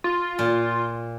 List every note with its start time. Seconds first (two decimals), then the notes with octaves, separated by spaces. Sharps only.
0.04 F4
0.39 A#2